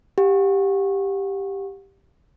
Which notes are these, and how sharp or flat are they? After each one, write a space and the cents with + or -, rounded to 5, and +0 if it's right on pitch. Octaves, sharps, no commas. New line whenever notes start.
G4 +5 F#5 -40